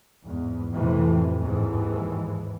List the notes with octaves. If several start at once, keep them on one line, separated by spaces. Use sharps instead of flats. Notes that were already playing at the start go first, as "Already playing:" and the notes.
E2 G#2
F2 A2 C3 E3
D#2 G#2 E3